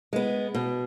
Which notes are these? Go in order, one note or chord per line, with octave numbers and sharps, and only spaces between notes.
G#3 B3
B2